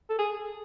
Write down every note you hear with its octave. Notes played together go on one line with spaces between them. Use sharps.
A4
G#4